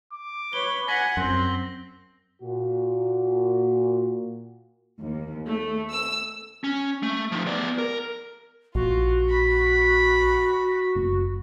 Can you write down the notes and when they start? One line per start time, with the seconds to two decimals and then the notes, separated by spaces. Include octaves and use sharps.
0.13 D6
0.53 B4 C#5 G7
0.88 F#5 G#5 A#6 B6 F#7
1.17 F#2 C4 C6
2.43 A#2 F#4
5.00 D#2
5.46 A3
5.91 E6
6.64 C#4
7.03 A3
7.32 F3 D#4
7.47 B3 D5
7.78 A#4
8.75 A#1 F4 F#4
9.30 B5
10.95 F#1